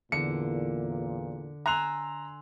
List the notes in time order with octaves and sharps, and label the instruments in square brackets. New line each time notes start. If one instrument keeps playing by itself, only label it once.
[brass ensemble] E2 A#2 [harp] D3 [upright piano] C#7
[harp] G#5 C6 E6 [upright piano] A#5 F#6 F7